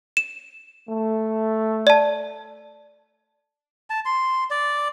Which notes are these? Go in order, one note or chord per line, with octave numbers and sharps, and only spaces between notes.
E7
A3
D5 A5
A5
C6
D5